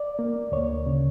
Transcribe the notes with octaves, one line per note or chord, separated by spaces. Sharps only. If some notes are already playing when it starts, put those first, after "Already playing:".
Already playing: D5
A#3
D2 C#5
C#3